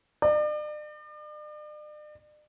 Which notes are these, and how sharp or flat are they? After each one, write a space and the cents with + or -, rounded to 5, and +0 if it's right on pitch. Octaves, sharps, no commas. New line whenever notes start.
D5 +40